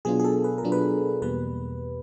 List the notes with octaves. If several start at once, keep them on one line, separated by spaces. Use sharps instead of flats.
B2 F#3 B3 D4 F4 G#4
G#4
A4
B4
A#4
B2 F#3 B3 D4 F4
B4
E2 B2 G3 A#3 B4